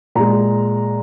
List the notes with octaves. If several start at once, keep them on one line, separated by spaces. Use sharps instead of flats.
A#2 G#3 A#5